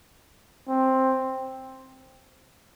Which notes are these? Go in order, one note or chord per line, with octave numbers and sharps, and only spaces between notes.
C4